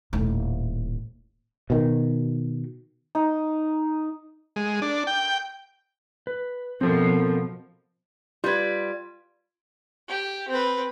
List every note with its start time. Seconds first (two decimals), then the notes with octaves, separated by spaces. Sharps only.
0.13 D#1 A2
1.70 B2 D#3
3.15 D#4
4.56 G#3
4.82 D4
5.07 G5
6.27 B4
6.81 B2 F3 C4 A4 A#4
8.44 G3 F4 B4 G#6
10.08 G4
10.48 C4 B4